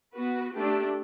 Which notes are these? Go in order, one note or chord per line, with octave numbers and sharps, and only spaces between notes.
B3 F#4 B4
A3 D4 G4